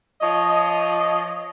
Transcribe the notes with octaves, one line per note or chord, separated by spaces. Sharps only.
F3 C#5 D#5